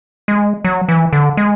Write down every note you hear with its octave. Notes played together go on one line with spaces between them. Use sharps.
G#3
F#3
E3
D3
G#3